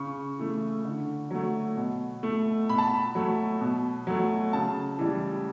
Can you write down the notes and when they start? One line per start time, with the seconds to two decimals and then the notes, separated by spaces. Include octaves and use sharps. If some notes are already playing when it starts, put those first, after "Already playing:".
Already playing: C#3 C#6
0.39 E3 A3
0.85 D3
1.31 F#3 A3
1.77 B2
2.23 A3
2.69 B2 B5
2.78 A5
2.87 B5
3.15 F#3 A3
3.61 B2
4.07 F#3 A3
4.53 C#3 A5
4.98 E3 G3